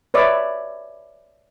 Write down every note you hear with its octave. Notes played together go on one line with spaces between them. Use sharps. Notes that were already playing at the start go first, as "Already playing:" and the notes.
B4 C#5 D5 E5